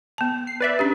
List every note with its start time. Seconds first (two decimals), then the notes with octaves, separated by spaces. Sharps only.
0.18 B3 A5
0.47 C7
0.61 B4 D5 E5
0.79 C#4 D4 G4